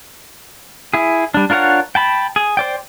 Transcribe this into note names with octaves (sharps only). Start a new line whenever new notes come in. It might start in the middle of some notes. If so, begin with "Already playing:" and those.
E4 G#4
G3 D4
D4 F4 A#4 C#5 F#5
G5 A5 B5
G#4
C5 D5 G5